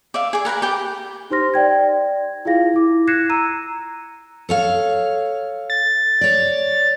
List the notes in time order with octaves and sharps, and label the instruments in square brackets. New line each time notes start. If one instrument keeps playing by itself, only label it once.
[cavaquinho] D5 E5 F5
G#4 D5
A#4 B4 G5 A#5
G4 G5
[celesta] D#4 G4 C5 C6 F6 A#6
D5 G5 G#6
E4 F4 G#4 F5 A#6
E4 D6
F#6 G#6 A#6 C7 C#7 E7
A#5 E6 D#7
[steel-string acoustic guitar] A4 C#5 F5
[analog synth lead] A6
[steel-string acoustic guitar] C#5 D5